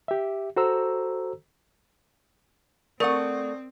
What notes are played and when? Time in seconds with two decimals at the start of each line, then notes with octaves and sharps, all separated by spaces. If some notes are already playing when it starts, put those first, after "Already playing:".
0.08 G4 E5
0.56 F#4 A4 C5 A#5 E6
3.00 A3 C4 A#4 D5 F#5 D#6